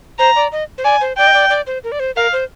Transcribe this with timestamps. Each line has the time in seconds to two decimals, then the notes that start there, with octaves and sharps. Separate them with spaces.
0.19 C5 A#5
0.36 D5
0.52 D#5
0.78 C5
0.84 D5 G#5
1.01 C5
1.18 D5 G5
1.27 D#5
1.34 D5
1.50 D5
1.67 C5
1.84 A#4
1.92 D5
2.00 C5
2.16 A#4 F5
2.33 C5